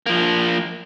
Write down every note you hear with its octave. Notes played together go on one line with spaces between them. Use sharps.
F3 A#3